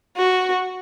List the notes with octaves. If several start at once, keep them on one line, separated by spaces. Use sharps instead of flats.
F#4